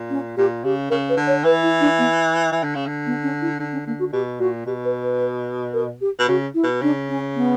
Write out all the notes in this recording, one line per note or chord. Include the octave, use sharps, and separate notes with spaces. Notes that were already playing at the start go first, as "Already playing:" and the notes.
Already playing: A#2
C#4
A#2 G4
C#3 G4
C#3 A#4
B4
D3
C#5
E3 B4
E4
D4
B3
E3
D3
C#3
D3
B3
C#4
E4
D3 D4
C#4
D3 A#3
F#4
B2 G4
A#2 F#4
B2 G4
B4
B4
A#4
G4
B2
C#3 F#4
E4
B2
C#3 D4
C#4
B3